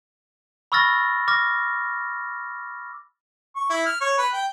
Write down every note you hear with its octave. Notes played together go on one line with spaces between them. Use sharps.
B5 C#6 E6 F6 A6 A#6
D6 F6 A#6
C#6
E4
F6
C#5
B4
G5